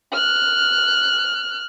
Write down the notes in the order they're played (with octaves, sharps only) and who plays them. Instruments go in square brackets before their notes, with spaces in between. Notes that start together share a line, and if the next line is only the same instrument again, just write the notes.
[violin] F6 F#6